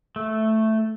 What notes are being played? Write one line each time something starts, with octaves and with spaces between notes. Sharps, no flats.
A3